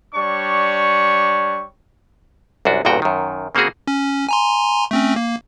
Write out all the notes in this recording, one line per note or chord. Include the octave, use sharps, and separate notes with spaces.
G3 D4 C#5 C#6
C2 F#2 D4 F#4
A1 E2 G2 A#2 F#4 G5
F#2 D#3
C#3 A#3 C4 F#4 G#4
C#4
G#5 A#5 C6
A3 C4 C#4
A#3